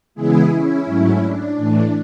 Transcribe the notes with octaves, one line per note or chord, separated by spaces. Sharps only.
C#3 E3 G#3 B3 E4 G#4
C#4 E4
G#2 F#3 A3
D4
A2 E3 A3